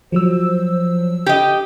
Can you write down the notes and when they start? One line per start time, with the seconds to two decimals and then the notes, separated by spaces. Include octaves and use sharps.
0.12 F3 F#3 C5 E6
1.26 G4 D#5